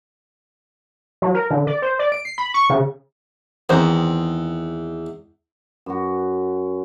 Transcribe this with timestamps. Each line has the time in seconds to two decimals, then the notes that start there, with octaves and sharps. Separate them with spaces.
1.22 F#3
1.34 A#4
1.50 D3
1.67 D5
1.82 C5
1.99 D5
2.12 D7
2.25 C7
2.38 B5
2.54 C#6
2.70 C#3
3.69 E2 D#3 C4 C5
5.86 F#2 F#4